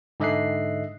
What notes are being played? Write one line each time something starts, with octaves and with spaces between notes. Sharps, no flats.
G#2 D3 D#5 E5 F#6 C7